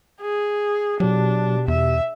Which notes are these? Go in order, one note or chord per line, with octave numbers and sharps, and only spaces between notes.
G#4
B2 F#3 D4 G4
E2 E5